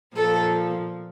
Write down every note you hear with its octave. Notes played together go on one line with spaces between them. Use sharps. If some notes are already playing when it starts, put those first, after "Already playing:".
A#2 F3 A4